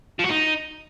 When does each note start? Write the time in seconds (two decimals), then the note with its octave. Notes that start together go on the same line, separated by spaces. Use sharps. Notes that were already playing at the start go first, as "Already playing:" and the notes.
0.19 F3
0.24 F#4
0.29 D#4